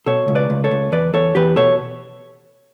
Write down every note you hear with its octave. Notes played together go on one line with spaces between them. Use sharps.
B2 A4 C#5
C#2
B4 D5
C#2
A4 C#5
C#2
E2 B4 D5
E2 A4 C#5
E2 G4 B4
B2 A4 C#5